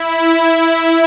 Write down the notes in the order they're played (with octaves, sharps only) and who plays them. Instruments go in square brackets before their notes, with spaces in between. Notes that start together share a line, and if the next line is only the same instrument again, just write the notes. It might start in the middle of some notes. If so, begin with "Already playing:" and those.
Already playing: [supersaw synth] E4